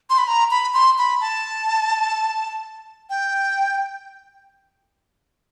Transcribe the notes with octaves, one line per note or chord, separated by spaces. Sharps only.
C6
B5
A#5
B5
C6
B5
A5
G5